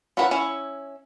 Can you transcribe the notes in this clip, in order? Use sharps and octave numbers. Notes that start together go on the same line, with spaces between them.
C#4 E4 A#4 B4 F#5
C#4 E4 C#5